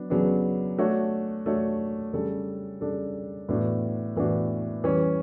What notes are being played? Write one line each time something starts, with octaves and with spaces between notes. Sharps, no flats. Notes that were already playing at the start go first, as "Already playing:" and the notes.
Already playing: F#3 B3 D4
C#3 F#3 B3 D4
A3 D4 F#4 C#5
A3 D4 F#4 C#5
C#3 G3 D4 A4
C#3 G3 D4 A4
A2 E3 B3 D4 F#4
A2 E3 B3 D4 F#4
E3 G3 C#4